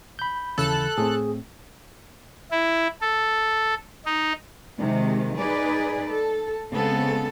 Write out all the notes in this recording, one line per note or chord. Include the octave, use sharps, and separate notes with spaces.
B5 G6
D#2 C#3 E3 A4 F#6
A2 A3 C4 G#4
E4
A4
D#4
C3 D#3 G#3
D#4 G#4 B4 D5
A4
C#3 G#3 B3 C4 A4